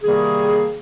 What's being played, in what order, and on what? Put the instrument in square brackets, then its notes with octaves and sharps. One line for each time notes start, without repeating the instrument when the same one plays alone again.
[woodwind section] C3 D#3 G3 A#3 G#4